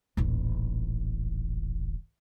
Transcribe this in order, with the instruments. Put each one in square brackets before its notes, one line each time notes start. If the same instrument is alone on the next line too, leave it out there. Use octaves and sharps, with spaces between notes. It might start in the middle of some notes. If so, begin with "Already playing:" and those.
[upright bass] D#1 A1